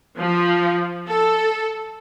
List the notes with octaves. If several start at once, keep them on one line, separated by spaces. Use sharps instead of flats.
F3
A4